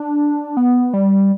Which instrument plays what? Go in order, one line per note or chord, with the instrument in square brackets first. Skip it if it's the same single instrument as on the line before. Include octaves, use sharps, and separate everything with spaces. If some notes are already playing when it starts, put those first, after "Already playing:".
Already playing: [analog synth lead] D4
B3
G3